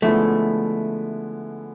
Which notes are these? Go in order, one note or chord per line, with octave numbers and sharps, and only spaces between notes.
D3 F3 G#3 A3 B3 E4